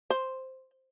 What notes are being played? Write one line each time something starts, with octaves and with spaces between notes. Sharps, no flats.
C5